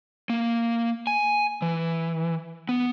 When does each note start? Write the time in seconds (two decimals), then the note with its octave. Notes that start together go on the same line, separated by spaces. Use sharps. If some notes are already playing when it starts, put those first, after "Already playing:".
0.30 A#3
1.07 G#5
1.62 E3
2.69 B3